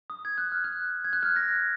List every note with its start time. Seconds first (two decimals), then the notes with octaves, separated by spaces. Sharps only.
0.10 D#6
0.25 G#6
0.38 F#6
0.52 F6
0.64 F#6
1.04 G#6
1.13 F#6
1.23 F6 G#6
1.35 F#6 A#6